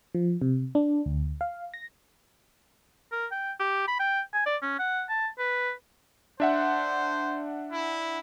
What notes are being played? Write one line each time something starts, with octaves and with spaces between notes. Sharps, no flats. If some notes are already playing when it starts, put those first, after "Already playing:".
F3
C3
D4
D2
F5
A#6
A#4
G5
G4
B5
G5
G#5
D5
C#4
F#5
A5
B4
D4 C5 E5 F#5
E4